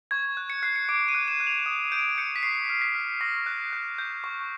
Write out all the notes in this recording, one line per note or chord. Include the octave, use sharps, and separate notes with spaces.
C#6 G#6
F#6
C#7
F#6 C7
C#7
D6 D7
D#7
F#6
E7
F#6
F7
D#6
G6 D7
G6 C#7
B6
C#6 C7
F6
B6
F6
C#6 A#6
F#6
F#6
G6
C#6